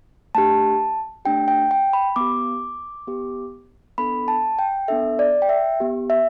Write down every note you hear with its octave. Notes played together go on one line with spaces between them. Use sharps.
A3 D4 G4 A5
A3 D4 G4 G5
G5
G5
B5
B3 G4 D6
B3 G4
B3 D4 A4 B5
A5
G5
B3 D4 A4 E5
D5
G5
E5
B3 G4
E5